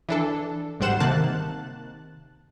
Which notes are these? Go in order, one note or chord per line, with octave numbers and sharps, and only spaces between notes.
E3 D4 A4
G#1 G#2 G3 C5 F#5 E7
C3 D#3 A#3 A5 F#6